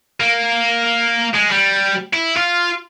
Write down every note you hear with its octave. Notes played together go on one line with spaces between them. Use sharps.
A#3
G#3
G3
E4
F4